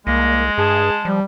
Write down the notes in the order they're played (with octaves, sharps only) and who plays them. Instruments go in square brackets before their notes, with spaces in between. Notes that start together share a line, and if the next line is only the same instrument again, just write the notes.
[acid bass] C2 [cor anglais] G#3 [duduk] A#3 [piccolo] A#6
[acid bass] G2 [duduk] G#4 [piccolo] A5
[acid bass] F3 [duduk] G3